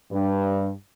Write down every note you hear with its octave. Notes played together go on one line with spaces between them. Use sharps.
G2